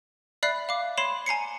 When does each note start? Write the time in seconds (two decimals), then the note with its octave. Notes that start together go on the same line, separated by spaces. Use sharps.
0.43 D5 E5 B5 F#6 C7
0.69 F5 D6
0.97 C#5 B5 C6 C7 E7
1.26 G#5 A#5 C7 C#7